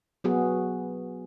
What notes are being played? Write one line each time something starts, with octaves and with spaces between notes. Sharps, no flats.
F#3 B3 F#4 G#4